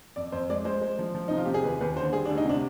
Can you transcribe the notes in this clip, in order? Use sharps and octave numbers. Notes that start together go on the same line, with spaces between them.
F2 D5
F2 C5
G#3 D5
G#3 C5
G#3
F3
F3
C3 D#4
F4
C3 G4
G#4
D#2 B4
D#2 B4
D3 C5
G3 G#4
D4
D2
D#4
C3 D4